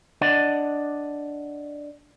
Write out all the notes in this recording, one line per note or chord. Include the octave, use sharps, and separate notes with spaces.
D4 D5 D#5 F#5